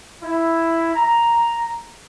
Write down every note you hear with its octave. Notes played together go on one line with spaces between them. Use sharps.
E4
A#5